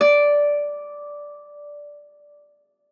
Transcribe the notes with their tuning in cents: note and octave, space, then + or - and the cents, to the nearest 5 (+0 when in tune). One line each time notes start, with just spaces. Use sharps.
D5 -5